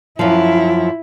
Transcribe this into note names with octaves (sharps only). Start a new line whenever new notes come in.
F#2 F3 E4